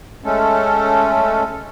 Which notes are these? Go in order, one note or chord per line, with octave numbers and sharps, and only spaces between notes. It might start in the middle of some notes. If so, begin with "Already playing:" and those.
G#3 A3 C#4 A4